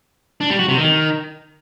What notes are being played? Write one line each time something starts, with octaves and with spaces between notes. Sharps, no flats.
D4
G3
F#4
C3
D#3